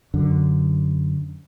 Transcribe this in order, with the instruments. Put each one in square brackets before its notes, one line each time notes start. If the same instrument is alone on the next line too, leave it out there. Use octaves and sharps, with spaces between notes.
[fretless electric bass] F#2 D3